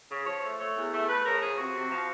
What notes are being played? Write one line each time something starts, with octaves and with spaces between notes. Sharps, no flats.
C#3
F3 C#5
A3
A3 C#5
E2
A3
A3 B4
C#3 A#4
F3 G#4
C3 F#4
C3
F3